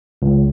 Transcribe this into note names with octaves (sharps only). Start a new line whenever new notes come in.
C#2